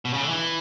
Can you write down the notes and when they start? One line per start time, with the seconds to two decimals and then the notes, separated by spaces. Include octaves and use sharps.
0.05 B2
0.13 C#3
0.21 D3
0.29 E3